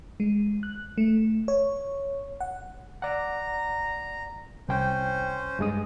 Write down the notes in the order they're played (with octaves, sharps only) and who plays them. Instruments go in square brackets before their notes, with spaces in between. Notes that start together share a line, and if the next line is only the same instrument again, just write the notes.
[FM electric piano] G#3
F#6
A3
C#5
F#5
[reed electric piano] D5 F#5 [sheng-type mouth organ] A#5
[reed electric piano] C2 G5 [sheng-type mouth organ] C#4 C5
[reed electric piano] G2 G#3 D#6